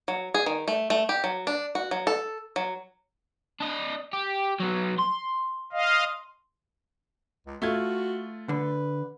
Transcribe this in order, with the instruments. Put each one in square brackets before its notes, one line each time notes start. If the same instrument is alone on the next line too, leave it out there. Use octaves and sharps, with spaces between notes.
[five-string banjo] F#3
G#4
D#3
A3
A3
G4
F#3
D4
F#4
F#3
A4
F#3
[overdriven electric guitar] D4 D#5
G4
F#3 B3
C6
[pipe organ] D#5 F5
[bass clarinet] C#2
[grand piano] A3 F4 G#6 [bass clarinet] F#4
[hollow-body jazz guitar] D3 [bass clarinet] B4